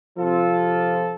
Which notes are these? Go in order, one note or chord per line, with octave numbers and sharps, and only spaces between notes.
C3 F3 F4 A4